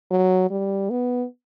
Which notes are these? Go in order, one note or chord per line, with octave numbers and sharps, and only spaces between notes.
F#3
G3
B3